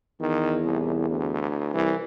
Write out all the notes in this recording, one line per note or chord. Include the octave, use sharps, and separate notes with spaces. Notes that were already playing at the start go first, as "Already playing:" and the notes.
E2 D#3
C2
D2
C2 E3